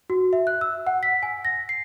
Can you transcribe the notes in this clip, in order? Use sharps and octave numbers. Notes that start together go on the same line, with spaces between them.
F#4
E5
F#6
E6
F#5
B6
G#5
A#6
C7